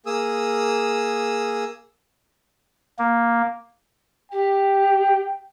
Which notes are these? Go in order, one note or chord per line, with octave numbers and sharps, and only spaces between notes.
A#3 G#4 D#6 E6
A#3
G4 G5